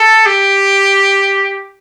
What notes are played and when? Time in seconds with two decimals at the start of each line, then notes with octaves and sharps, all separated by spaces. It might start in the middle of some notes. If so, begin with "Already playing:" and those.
Already playing: A4
0.26 G4